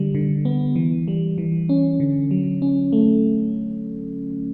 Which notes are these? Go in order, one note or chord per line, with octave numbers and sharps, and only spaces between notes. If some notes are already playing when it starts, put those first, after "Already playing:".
Already playing: D3 G3
D3
B3
E3
G3
E3
C#4
D3
F#3
C#4
A3